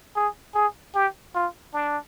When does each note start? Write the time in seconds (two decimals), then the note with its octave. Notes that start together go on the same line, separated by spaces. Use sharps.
0.16 G#4
0.55 G#4
0.95 G4
1.35 F4
1.74 D4